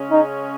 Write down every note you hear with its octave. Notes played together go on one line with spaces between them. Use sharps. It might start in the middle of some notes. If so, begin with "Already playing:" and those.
Already playing: C#3 G#3 C#4
D#4